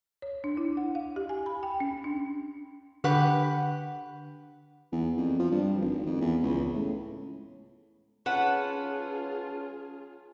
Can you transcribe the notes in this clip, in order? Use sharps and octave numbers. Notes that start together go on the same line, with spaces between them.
C#5
D4
E4
F#5
F5
G4
G#5
B5
G5
C#4
D4
D3 G4 B4 F#5
E2
F2
F3
G2
G#1
F2
E2
C#2
A2
C#4 F4 G#4 B4 C#5 F#5 A5